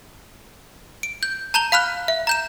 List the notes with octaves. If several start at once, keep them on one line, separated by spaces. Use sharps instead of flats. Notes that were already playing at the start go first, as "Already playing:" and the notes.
D7
G6
A5 A#5 G6 F7 G7
F5 B5 F6 F#6
E5
A#5 G6 E7